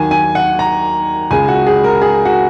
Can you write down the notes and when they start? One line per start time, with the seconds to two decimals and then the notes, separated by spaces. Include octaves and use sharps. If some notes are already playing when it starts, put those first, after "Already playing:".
Already playing: D#2 D#3 F#3 G#5
0.11 G#5
0.35 F#5
0.59 A#5
1.31 C#2 C#3 G#3 G#5
1.48 F#4
1.67 G#4
1.84 A#4
2.02 G#4
2.25 F#4